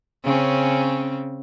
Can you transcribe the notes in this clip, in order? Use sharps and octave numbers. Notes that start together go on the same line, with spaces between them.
C#3 C4 C#4